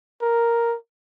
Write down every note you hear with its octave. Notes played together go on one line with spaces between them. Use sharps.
A#4